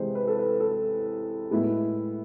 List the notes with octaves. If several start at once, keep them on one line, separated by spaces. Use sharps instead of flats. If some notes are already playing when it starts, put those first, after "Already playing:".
Already playing: C3 E3 G#3 C5
B4
A4
B4
A4
A2 G#3 B3 E4